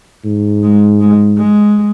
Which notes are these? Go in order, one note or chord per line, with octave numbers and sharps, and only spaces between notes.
G#2
G#3
G#3
G#3